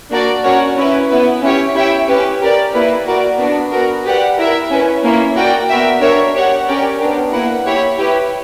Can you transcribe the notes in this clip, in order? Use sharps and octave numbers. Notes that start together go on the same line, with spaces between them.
A#3 D4 F#4 A#4 D5
C#4 F#4 A#4 C#5 F#5
C#4 E4 B4
B3 E4 B4
C#4 E4 G4 C#5
E4 G4 C#5 E5 G5
C#4 G4 B4
G4 A#4 D5
A#3 E4 B4
F#4 A#4 D5
B3 D4 F#4
B3 F#4 A#4
G4 B4 D5 F#5
E4 A#4 E5
C#4 E4 B4
A#3 C#4 E4
F#4 A#4 D5 G5
B3 F#4 A#4 E5 G5
D4 A#4 C#5 E5
G4 C#5 F#5
C#4 G4 A#4 D5 G5
B3 D4 G4 A#4
A#3 E4 B4 F#5
E4 G4 C#5
E4 G4 B4